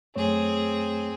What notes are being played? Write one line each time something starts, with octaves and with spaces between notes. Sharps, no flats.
F#2 A3 C4 G#4 C#5